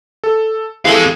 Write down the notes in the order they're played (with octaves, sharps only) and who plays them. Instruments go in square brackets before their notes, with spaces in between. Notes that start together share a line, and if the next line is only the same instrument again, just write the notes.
[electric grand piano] A4
[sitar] E3 G#3 E4 [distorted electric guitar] C4 F5 [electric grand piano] G4 A4